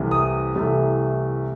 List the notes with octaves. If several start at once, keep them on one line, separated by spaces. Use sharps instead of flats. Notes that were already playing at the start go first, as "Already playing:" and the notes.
Already playing: C2 C3 E3 A3
D#6
C2 C3 E3 A3